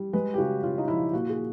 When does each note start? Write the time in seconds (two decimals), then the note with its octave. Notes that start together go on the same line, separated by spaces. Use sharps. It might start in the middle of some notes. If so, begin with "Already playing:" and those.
Already playing: G3
0.13 G#3 B4
0.34 G4
0.38 C#3 F#4
0.63 C#3 F4
0.78 D#4
0.88 F3 E4
1.13 A#2 F#4
1.29 G#4